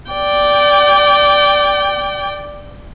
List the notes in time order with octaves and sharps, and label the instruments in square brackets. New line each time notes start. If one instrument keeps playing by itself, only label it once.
[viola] D5 G5